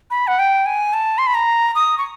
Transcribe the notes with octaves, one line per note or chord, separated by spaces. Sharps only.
B5
F#5
G5
G#5
A5
C6
B5
A#5
D#6
C#6